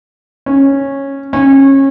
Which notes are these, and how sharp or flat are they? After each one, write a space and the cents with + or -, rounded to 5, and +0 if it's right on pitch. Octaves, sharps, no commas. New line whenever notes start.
C#4 -10
C#4 -25